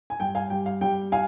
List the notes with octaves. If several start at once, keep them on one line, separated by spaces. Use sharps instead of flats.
G#5
G2 G5
F5 G#5
G3 G5
F5
G3 G5
F5 G#5